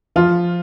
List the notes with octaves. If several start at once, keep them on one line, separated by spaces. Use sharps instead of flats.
F3 F4